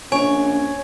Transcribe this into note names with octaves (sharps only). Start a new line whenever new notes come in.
A#1 C#4 C#5 G#5